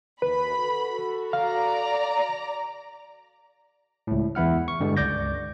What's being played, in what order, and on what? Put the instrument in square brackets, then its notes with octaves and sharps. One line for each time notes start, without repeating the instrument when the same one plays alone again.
[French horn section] D#2 [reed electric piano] B4 [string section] B5
[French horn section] F#4 A4
[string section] D5 A#5 [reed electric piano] F5
[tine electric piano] C#2 A2
E2 E3 E4 F#5 F6
C#6
G2 D3 G3 G#3
C#2 D5 D6 G6 A#6